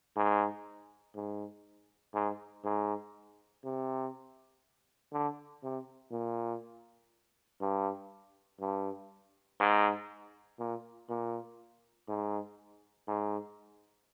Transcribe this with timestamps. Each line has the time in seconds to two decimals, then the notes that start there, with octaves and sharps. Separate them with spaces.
0.16 G#2
1.15 G#2
2.14 G#2
2.64 G#2
3.64 C3
5.13 D3
5.63 C3
6.11 A#2
7.61 G2
8.60 G2
9.60 G#2
10.59 A#2
11.09 A#2
12.08 G#2
13.07 G#2